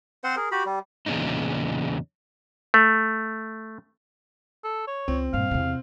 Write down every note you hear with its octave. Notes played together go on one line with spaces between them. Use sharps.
C4 C5 F#5 C6
G#4 A#4
F#4 G4 B5
G3
E2 A#2 C#3 D4 D#4
A3
A4
C#5
C#2 C4
G2 A#2 F5
E2 C3